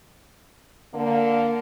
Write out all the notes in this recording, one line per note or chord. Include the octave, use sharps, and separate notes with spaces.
D3 A#3